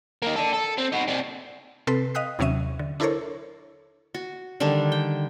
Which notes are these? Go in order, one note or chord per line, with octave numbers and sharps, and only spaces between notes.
A#3 D#4
D4 A4
A4
C4
D#4 F#4
C4 D4
C3 C4 A4 B4 B6 C7
D#5 F5 G5 D#6 F#6 B6
D#2 C3 F#3 C#4 E5 D#7
D3
D4 E4 A4 A#4 C5 C#5
F#4
D3 D#3 G3 D4
G5